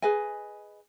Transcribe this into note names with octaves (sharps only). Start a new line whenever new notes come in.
G#4 B4 D#5 G#5